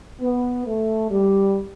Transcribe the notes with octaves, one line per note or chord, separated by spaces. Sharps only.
B3
A3
G3